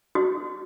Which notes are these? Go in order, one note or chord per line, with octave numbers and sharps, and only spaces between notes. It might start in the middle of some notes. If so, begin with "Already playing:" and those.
F#4